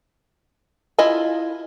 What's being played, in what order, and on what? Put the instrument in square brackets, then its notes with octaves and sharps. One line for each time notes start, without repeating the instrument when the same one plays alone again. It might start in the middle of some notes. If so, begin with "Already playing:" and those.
[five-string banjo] E4 F4 D#5 G#5